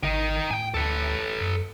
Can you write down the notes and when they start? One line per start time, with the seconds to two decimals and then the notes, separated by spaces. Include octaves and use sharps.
0.03 G#1 D#3 D#4
0.51 A2 G5 G#5
0.74 D2 A4 B4
1.41 F#2